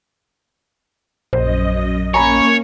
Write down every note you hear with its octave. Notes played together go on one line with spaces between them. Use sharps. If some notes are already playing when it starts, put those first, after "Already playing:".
A#1 F#2 C5 D#5
A#3 C#4 C#5 G#5 A#5 B5